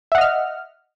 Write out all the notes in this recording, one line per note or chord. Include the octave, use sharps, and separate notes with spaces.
D#5 E5 F#5 F6